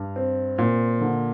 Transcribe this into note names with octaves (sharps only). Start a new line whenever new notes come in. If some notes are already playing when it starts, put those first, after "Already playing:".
Already playing: G2
C4
A#2
D3